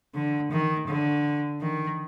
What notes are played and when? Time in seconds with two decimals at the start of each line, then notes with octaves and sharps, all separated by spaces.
0.14 D3
0.51 D#3
0.88 D3
1.61 D#3